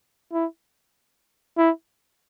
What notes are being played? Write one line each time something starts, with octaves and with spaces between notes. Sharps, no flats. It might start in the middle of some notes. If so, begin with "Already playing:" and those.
E4
E4